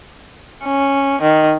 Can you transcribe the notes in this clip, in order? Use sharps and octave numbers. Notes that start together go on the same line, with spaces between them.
C#4
D#3